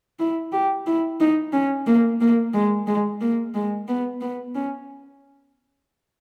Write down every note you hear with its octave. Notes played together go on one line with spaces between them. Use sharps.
E4
G4
E4
D#4
C#4
A#3
A#3
G#3
G#3
A#3
G#3
B3
B3
C#4